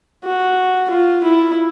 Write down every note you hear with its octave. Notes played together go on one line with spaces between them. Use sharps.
F#4
F4
E4